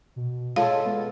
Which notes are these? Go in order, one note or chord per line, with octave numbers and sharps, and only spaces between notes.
B2
G#3 F4 A4 C#5 F5
G#3 B3